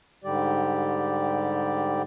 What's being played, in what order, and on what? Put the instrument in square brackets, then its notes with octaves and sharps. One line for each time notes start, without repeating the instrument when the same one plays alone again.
[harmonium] G#2 D3 G3 G4 D5